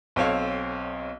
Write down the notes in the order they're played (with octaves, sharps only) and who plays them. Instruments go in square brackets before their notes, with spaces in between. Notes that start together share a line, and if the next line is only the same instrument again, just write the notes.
[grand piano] B1 C4 A4 C#5 F5